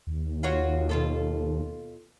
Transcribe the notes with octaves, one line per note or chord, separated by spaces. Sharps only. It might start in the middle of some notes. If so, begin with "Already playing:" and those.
D#2
F4 F#4 C#5
B2 F4 A4